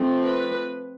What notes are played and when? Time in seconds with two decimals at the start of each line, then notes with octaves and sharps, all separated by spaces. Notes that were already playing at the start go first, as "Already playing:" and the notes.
Already playing: F3 A3 C4
0.24 B4